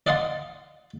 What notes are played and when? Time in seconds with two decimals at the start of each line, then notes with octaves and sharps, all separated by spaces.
0.07 D5 D#5 F5 F#5 A5 C6